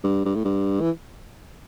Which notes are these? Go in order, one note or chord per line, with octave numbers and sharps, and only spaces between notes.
G2
G2
A2
G2
E3